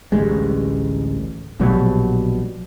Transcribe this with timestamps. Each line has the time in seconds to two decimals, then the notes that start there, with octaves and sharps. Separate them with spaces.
0.12 A1 D2 G3 G#3
1.60 A#1 B2 F#3 G3